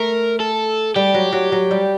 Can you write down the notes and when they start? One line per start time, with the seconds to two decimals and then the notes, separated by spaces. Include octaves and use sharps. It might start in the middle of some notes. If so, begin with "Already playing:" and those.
Already playing: A3 A#4
0.40 A4
0.96 G3 G4
1.14 F#3
1.33 F#3
1.52 F#3
1.71 G3